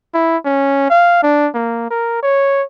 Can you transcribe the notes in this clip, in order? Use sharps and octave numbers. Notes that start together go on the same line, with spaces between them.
E4
C#4
F5
D4
A#3
A#4
C#5